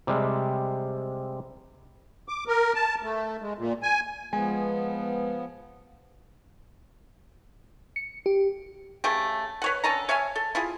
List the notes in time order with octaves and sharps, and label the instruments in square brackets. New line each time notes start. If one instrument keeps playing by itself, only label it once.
[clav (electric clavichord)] C3 G3 G#3 C4
[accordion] D6
A#4
A5
A3
G#3
A#2
G#5
[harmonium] F3 B3 [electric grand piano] G#3 [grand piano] G#5
[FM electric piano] C#7
G4
[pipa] C#3 A3 G4
B4 C#5 F#5
D3 C#4 A4 A#5
C#5 E5 F5 G#5
A4
E4 F4 G#4